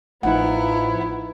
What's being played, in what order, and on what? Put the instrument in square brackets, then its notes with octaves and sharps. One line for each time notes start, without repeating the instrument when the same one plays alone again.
[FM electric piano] A1 A2 [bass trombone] F3 [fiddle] B3 E4 [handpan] D#4 F#5